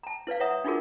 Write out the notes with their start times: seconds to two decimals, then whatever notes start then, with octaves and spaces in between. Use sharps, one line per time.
0.03 A5 A#5
0.27 E4 B4 D5 F5
0.40 B4 C#5 E5 F#5 A#5 D#6
0.64 D4 D#4 F4 F#4 G#4 A#4